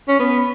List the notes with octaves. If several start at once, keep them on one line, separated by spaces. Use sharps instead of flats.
C#4
B3